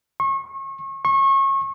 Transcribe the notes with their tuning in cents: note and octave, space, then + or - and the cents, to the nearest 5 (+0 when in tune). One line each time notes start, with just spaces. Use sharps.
C#6 -35
C#6 -30